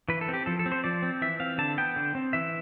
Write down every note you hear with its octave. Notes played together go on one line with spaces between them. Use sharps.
E3 B4
A4
C4
G4
F3 A4
A4
C4
C5
F3 D5
C4
E3 E5
C4 F5
D3 A5
B3 G5
D3
C4
E3 E5